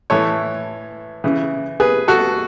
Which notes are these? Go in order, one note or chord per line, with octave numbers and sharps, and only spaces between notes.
A2 E3 A4 C#5
C#3 E3
G#4 B4
F#4 A4